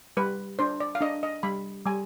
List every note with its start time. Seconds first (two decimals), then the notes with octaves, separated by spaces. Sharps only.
0.17 G3 B4
0.59 D4 C5
0.80 D5
0.95 F5
1.01 D4 D#5
1.23 D#5
1.43 G3 B5
1.86 G3 G#5